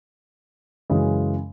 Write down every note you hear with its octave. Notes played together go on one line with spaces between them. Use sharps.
F#2 C#3 E3 G#3